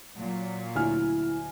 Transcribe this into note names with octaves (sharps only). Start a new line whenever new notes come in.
A#2 F#3
D2 E4 G#5 F6